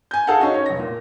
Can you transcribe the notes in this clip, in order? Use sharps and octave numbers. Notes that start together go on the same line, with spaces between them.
G#5 G6
G#4 A4 F5 F#5
C#4 D#4 F#4
C#5
F1 A#6
A#2